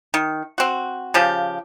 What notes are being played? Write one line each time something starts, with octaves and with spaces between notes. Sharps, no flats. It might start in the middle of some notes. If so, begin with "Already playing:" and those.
D#3
C4 F#4
C#3 F3 G4